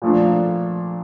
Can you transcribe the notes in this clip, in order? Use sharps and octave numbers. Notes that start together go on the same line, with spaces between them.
A#2 F3 A3 D4